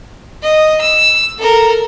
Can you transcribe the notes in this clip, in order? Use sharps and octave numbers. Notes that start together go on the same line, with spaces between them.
D#5
E6
A4 A#4